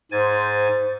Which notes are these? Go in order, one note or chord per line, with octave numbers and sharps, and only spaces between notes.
G#2 C5 G#5 A6